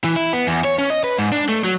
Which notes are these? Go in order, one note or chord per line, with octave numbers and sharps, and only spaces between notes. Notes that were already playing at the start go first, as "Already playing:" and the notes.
E3
E4
B3
E2
C#5
C#4
D#5
B4
G#2
D4
A3
F#3